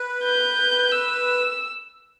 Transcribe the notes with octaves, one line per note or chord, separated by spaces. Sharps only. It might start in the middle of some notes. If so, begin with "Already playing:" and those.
Already playing: B4
G6
E6